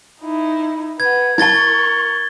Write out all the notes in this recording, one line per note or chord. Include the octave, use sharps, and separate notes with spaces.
D#4 E4
B4 F#5 G#6
E4 A#4 A5 C#6 G#6 A6 G7